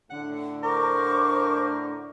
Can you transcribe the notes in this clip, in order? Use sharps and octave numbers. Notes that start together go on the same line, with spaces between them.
A2 D3 F#5
A#4 C5 C#6 D6